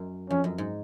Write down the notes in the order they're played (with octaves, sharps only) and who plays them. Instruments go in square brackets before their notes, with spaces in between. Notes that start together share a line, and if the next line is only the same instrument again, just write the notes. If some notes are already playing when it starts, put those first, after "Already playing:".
Already playing: [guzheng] F#2
[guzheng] F2 [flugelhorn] C#4
[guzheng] F#2
G#2